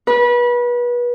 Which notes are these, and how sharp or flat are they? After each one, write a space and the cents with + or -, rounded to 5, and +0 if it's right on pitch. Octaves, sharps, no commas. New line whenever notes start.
B4 -30